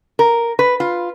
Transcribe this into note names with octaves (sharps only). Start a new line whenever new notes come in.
A#4
B4
F4